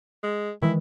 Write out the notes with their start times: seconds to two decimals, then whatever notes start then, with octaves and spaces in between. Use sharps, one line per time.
0.23 G#3
0.62 D#3 E3 G#3 E4